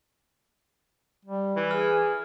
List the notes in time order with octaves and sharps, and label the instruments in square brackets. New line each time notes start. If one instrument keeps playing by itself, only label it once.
[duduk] G3
[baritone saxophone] E3
[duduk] G#4 [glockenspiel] F6